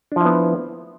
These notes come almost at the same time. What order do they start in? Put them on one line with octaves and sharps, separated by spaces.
D4 F3 E4 B3